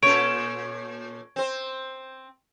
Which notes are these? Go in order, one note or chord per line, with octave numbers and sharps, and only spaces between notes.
A#2 C#4 A4 C#5 D7
C4 C5